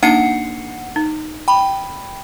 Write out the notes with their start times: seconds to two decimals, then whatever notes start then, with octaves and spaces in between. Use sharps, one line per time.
0.03 A#3 D4 D#4 F#5 C7 C#7
0.96 D#4
1.48 G5 B5